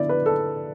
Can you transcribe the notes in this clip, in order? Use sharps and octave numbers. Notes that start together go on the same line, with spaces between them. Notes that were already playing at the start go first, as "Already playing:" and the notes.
Already playing: D3 B3 E4 D5
B4
A4